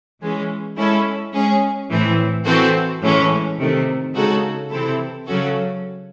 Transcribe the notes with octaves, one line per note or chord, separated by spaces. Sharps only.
E3 G#3 C#4
G#3 C#4 E4 A4
G#3 C#4 G#4
A2 E3 C4
E3 C4 F#4 A4
A2 E3 G#3 C#4
C3 D#3 A3
C#3 G#3 D#4 F#4 A4
C3 E3 C4 E4 A4
C#3 F#3 C#4 F#4 A4